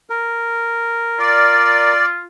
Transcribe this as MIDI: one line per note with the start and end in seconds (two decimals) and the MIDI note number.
0.10 1.93 70
1.19 2.24 65
1.19 2.06 74